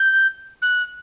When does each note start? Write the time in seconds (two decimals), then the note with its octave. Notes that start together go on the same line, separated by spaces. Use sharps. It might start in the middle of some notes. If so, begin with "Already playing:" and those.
Already playing: G6
0.62 F#6